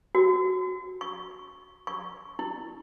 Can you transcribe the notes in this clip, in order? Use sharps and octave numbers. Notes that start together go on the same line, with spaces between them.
F#4
C#6
C#6
E4